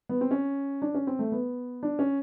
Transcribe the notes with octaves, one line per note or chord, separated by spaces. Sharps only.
B3
C4
C#4
D4
C#4
C4
A3
B3
D4
C#4